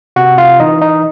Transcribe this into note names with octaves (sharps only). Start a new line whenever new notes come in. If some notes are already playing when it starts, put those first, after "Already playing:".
C3 F#4 F#5
F4 F5
E3 D#4 D#5
D#4 D#5